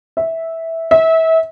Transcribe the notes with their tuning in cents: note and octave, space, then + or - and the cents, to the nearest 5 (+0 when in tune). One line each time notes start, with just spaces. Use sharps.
E5 -10
E5 -30